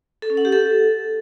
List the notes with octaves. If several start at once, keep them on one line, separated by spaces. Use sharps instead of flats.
A4
C#4
F#5
G4
A4